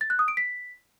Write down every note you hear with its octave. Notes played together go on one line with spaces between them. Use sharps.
A6
F#6
D#6
D7
B6